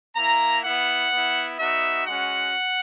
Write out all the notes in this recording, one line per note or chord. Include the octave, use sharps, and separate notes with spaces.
A#3 E4 A#5
B3 E4 F#5
B3 E4
B3 D#4 F#4 E5
G#3 C#4 F#4 F#5